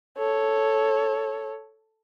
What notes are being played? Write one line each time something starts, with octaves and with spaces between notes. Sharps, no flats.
A4 C#5